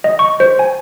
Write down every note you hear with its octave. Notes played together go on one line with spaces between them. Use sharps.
D#5
C#6
C5
G#5